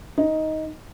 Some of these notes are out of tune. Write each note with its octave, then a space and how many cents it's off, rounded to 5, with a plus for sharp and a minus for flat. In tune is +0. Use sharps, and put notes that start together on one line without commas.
D#4 +10